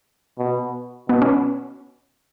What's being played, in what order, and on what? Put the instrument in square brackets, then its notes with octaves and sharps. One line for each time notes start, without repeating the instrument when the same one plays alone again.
[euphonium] B2
[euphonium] B2 [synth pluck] B3
[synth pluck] C#4